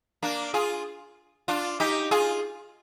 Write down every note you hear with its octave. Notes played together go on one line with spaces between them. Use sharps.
A#3 D4
F4 G#4
D4 F4
D#4 G4
F4 G#4